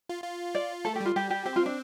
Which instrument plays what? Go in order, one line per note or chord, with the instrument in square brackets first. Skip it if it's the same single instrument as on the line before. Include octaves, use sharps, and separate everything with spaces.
[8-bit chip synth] F4
F4
[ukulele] D5
[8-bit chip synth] A3 [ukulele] A4
[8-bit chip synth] G3 [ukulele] G4
[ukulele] F4
[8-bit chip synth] G3 [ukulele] G4
[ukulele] G4
[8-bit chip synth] C4 [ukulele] G4
[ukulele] F4
D4